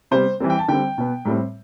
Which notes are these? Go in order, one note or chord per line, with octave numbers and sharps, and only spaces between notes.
C3 G3 B3 C5
E3 G3 C4
G5
A5
D3 G3 C4 G5
B2 B3
A2 G3 C4